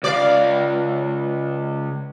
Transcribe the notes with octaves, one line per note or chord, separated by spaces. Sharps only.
C#2 D5 F5